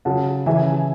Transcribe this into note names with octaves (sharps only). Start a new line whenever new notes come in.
C#3 F#3 F#5 A5
C#3 E3 E5 G#5